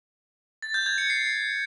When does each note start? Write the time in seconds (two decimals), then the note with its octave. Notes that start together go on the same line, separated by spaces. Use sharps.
0.62 A6
0.74 G6
0.86 G#6
0.98 C#7
1.10 C7